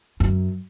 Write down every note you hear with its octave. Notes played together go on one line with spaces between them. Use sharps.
F#2